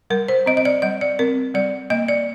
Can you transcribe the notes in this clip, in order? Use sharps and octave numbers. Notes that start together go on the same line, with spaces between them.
G3 A#4
C5
C4 D#5
D#5
D5
G3 D#5
D5
C4 A#4
G3 D5
A#3 D#5
D5